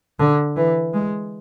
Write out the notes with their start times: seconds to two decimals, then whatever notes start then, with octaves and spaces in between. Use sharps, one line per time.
0.19 D3
0.56 E3
0.94 G#3